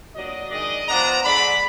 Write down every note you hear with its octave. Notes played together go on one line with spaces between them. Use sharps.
A#2 F#3 D4 D#5
D#3 G#3 D4 D#5
F3 B3 D4 A#5
D3 G#3 D4 B5